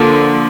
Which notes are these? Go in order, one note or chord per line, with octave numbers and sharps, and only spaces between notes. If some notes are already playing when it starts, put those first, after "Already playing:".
Already playing: D3 F3 A#3